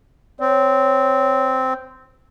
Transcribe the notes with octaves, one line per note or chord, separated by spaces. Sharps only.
C4 C#5